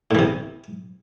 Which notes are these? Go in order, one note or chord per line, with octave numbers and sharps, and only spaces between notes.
A2 C3 E3